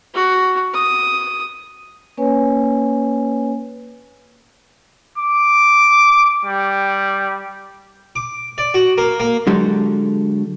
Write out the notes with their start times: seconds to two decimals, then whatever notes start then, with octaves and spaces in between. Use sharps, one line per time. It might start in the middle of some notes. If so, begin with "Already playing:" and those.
0.14 F#4
0.74 D#6
2.17 A#3 C#4 B4 C#5 G#5
5.18 D6
6.45 G3
8.16 D6
8.58 D5
8.74 F#4
8.98 A#3
9.20 A#3
9.47 D3 F#3 G#3 F#4 G4 A4